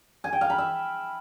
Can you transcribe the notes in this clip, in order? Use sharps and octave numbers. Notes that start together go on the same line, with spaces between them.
G#5
G5
F5
B5
E5